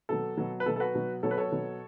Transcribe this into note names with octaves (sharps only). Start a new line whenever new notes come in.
B2 F#3 A4
B2 F#3
B4
B2 F#3 A4
A4
F#4 B4
B2 F#3
B2 F#3 A4 C#5
B4
A4 C#5
B2 F#3